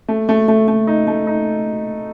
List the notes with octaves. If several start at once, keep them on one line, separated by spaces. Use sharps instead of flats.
A3
A3
A3
A3
D#4
A3
D#4